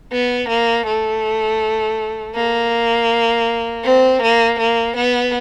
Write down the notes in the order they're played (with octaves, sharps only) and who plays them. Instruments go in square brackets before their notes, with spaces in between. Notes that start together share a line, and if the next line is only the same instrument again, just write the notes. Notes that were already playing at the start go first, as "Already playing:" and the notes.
[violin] B3
A#3
A3
A#3
C4
A#3
A#3
B3